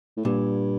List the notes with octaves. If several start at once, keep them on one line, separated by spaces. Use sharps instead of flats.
A2
G2 A#2